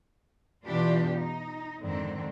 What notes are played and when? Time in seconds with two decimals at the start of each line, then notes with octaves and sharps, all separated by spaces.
0.66 B2 E3 B3 D4 F4 G4
1.17 D#4
1.84 F2 G#2 D3 D#3 C4